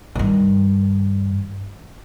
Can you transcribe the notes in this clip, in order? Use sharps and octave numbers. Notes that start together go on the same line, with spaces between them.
G2 D#3